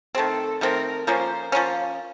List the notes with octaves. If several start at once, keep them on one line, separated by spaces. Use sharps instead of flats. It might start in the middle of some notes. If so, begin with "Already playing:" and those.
D#3 A3 C4 A4
D#3 A3 C4 A#4
F3 A#3 C#4 C5
F3 A#3 C#4